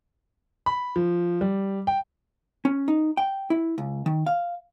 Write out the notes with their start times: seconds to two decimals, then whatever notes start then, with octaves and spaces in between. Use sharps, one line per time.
0.66 B5
0.96 F3
1.41 G3
1.87 G5
2.65 C#4
2.88 D#4
3.17 G5
3.50 E4
3.78 C#2
4.06 D#3
4.26 F5